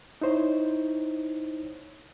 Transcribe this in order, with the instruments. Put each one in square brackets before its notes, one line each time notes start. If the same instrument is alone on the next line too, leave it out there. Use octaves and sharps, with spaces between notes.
[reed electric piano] D#4 E4 C5 C#5